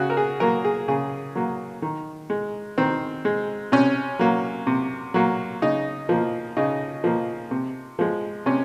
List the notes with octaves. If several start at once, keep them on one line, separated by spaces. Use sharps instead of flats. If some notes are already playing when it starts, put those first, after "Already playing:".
Already playing: C#3 F#4
A#4
G#4
F#3 A#3 A#4
G#4
C#3 G#4
F#3 A#3
D#3
G#3
D#3 C4
G#3
C3 C#4
F#3 A#3
C3
F#3 A#3
C#3 D#4
F3 A#3
C#3 D#4
F3 A#3
C3
F3 G#3
C3 C#4